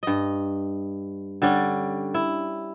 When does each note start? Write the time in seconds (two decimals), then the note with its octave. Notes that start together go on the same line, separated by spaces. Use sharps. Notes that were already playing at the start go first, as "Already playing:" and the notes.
0.03 G2 D#5
1.42 D3 G3 C#4
2.14 E4